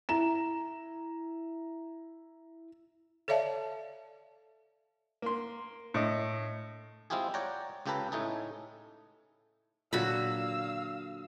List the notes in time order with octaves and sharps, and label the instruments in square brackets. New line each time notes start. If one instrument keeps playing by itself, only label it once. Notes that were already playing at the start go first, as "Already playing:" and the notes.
[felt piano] E4 A#5 E7
[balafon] A4 C#5 D5 E5 F5 A5
[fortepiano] A#3 C6
A2 D#5
[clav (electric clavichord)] G#3 C4 E4 F4 G4 G#4
C#5 D5 F#5 G5 A#5
C#2 C#3 G4 A4 B4 A#5
A2 A3 D#4 G#4
[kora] A#2 D3 F#3 [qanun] F#4 B5 [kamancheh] F5 E6